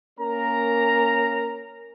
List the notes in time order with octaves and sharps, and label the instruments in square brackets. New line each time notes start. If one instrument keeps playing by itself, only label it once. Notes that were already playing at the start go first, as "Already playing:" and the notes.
[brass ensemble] A#3 C#4 A#4 A#5